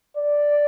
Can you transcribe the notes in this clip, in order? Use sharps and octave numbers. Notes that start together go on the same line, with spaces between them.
D5